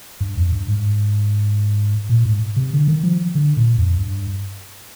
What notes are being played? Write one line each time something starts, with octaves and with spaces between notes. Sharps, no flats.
G2
F2
G2
G#2
A#2
G#2
C3
D3
D#3
F3
D3
A#2
F2
G2